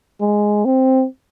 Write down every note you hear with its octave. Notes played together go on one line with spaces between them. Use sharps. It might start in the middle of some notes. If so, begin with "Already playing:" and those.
G#3
C4